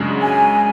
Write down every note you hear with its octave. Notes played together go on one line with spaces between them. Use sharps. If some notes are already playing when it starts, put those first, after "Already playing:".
Already playing: F#2 C#3 G#3 D4 F#4
G#5